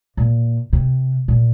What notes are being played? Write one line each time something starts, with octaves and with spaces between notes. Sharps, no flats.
A#2
C3
A#2